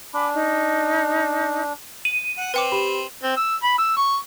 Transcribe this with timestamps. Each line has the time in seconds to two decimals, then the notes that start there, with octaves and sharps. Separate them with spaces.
0.14 D4 G#5 B5 D6
0.33 D#4
2.05 D#7 F#7
2.37 F#5
2.54 C4 B4 G5 D6
2.72 G4 B5 E7
3.23 C4
3.37 E6
3.63 B5
3.78 E6
3.97 C#6